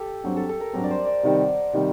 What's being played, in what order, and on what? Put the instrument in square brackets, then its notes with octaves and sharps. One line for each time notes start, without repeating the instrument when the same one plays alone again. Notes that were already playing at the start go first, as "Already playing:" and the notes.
Already playing: [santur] G4 A4
[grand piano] G2 F#3 C4
[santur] A4
A4
A#4
[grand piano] G2 F#3 C4 [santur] A#4
[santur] D5
C5
D5
[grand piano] C3 D#3 G3 [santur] F#5
[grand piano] C3 D#3 G3